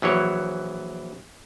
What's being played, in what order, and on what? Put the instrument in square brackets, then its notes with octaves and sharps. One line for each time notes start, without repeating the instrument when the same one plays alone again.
[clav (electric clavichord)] A#1 E3 F#3 C#5